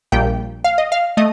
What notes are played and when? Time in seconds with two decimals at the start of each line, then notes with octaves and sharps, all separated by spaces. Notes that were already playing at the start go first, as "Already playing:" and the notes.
0.12 A#1 A#2 G3 G5
0.64 F5
0.78 D#5
0.92 F5
1.17 A3 D#5